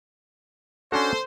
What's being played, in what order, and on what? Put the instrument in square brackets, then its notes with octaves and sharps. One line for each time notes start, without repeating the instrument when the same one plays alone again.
[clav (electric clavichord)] C#4 D4 F#4 [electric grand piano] A4 [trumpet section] C5